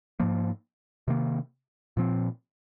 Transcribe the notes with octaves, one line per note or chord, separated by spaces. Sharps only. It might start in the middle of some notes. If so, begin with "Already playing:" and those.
G#2 F3 A#3
C3 D#3 A#3
A#2 F3 C4